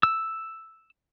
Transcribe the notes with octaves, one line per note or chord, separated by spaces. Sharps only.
E6